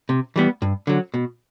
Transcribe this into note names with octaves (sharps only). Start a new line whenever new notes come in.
C3
E3 G3 B3
G2
D3 F#3
B2